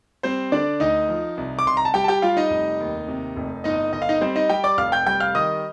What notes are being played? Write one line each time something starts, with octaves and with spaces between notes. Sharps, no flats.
G3 C4 C5
D3 D4 D5
D2 D#4 D#5
F3
C2
D6
C2 C6
A#5
A5
G3 G4 G5
A5
G4 G5
G3 F4 F5
D#4 D#5
F1
D#2
C3
F1
G1 D#4 D#5
G1 D#5
F5
D#4 D#5
G3 C4 C5
D#4 D#5
G3 G4 G5
D5 D6
F1 F5 F6
G5 G6
G3 G5 G6
F5 F6
D#3 D#5 D#6